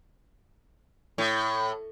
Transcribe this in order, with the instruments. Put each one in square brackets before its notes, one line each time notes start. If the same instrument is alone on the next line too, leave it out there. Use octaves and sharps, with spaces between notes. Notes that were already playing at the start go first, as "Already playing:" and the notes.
[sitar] A2